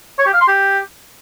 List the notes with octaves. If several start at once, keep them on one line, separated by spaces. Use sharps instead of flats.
C#5
G4
F5
C6
G4